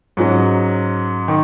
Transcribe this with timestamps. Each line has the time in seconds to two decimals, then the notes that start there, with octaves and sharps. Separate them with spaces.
0.17 G#2 F#3 C#4
1.28 D#3